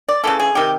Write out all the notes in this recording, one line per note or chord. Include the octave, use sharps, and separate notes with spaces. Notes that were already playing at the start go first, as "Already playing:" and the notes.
D5
C#3 E3 A3 A4
G#4
C3 D#3 G4